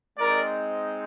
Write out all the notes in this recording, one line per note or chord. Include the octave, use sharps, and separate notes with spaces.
G#3 C4 D#4 A#4 D5